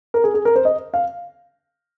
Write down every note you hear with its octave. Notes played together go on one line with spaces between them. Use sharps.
A#4
G#4
G#4
A#4
C5
D#5
F5